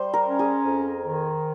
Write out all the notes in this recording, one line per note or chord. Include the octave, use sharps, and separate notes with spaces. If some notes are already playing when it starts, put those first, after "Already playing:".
Already playing: G3 C5
A#4
C#4
G#4
F2
D#3